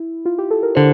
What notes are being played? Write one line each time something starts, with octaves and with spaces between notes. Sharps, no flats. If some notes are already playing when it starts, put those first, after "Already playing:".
Already playing: E4
F4
G4
A4
A#4
D3 C5